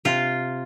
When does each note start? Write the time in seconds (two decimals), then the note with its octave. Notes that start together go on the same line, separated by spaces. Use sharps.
0.05 C3 F4